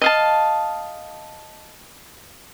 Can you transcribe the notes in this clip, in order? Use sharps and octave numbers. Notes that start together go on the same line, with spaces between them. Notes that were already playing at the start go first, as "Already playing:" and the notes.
D#5 F5 A5